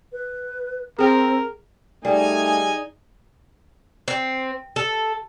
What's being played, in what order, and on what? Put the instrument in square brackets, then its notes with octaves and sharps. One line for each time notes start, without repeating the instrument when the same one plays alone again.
[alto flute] B4
[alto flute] C4 [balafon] G#4 G5 [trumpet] A#4
[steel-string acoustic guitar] G3 [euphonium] A3 [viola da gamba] D#4 [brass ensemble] G#4 D#5 G#5
[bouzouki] C4
A4